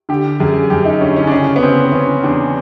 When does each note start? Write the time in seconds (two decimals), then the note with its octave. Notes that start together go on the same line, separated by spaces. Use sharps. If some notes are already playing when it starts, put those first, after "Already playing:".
0.09 D3 G4
0.40 F#2 G#4
0.70 F#2 G4
0.85 D#4
1.01 D3 C#4
1.16 C#4
1.27 D4
1.31 C#3 C#4
1.56 B3
1.62 C#3 C4
1.92 C#3 C#4
2.23 E2 D4